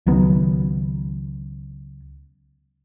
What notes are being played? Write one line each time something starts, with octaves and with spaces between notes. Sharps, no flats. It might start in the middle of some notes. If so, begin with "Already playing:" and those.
C#2 D#3 F#3 B3